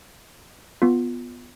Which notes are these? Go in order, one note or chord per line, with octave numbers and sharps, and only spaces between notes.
B3 F4